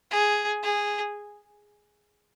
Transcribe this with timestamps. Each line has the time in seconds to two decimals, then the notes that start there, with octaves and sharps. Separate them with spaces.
0.11 G#4
0.63 G#4